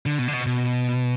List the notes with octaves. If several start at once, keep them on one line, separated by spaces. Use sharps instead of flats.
D3
B2
D3
B2
B2